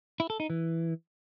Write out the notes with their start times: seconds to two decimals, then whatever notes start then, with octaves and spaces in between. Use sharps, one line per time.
0.20 E4
0.30 A4
0.40 D#4
0.50 E3